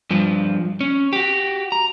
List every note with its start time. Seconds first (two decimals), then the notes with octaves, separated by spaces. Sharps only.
0.11 G2 F3
0.81 C#4
1.13 F#4 G4
1.72 A#5